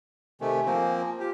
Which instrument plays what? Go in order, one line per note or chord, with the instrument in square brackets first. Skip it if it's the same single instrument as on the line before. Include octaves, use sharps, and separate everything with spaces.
[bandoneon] C3 D#3 A3 [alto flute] G#5
[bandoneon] F3 A#3 C4
[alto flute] F4 [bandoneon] G4